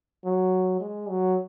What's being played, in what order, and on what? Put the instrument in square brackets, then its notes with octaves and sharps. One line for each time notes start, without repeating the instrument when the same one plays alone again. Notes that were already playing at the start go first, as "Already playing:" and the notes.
[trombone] F#3
G#3
F#3